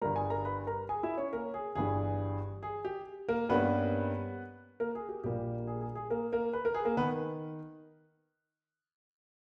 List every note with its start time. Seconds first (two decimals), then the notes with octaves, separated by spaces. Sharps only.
0.01 G1 G2 G3 A#4 A#5
0.16 G#4 G#5
0.30 A#4 A#5
0.45 B4 B5
0.67 A#4 A#5
0.89 G#4 G#5
1.03 E4 E5
1.17 C#4 C#5
1.33 A#3 A#4
1.54 G#4
1.75 G1 G2 E3 G3 G#4
2.63 G#4
2.85 G4
3.29 A#3 A#4
3.49 G2 G3 A#3 B3 C#4 B4
4.80 A#3 A#4
4.95 G#4
5.09 G4
5.24 A#1 A#2 G3 A#3 G4
5.67 G#4
5.81 G#4
5.95 G#4
6.10 A#3 A#4
6.32 A#3 A#4
6.53 B4
6.65 A#4
6.74 G#4
6.85 A#3 A#4
6.97 D#3 B3 B4